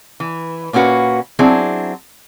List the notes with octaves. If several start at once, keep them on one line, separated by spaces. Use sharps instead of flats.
E3
A#2 A#3 C#4 F#4 B4
F#3 C4 D4 E4 G#4